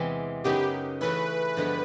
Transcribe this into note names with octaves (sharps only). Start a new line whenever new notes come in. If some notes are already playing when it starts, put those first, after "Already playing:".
Already playing: E2 C3 E3 G#3 C4
F#2 C#3 F#3 B3 D#4 G4
C#3 E3 A3 C#4 E4 B4
G2 D3 F3 G#3 B3